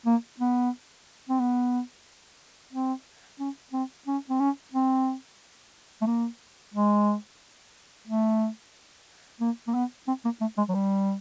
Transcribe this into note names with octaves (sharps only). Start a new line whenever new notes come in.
A#3
B3
C4
B3
C4
C#4
C4
C#4
C4
C#4
C4
A3
A#3
G#3
A3
A#3
A#3
B3
C4
A#3
A3
G#3
F#3
G3